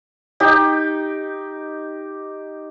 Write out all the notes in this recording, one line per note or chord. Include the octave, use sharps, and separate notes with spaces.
D#4 G4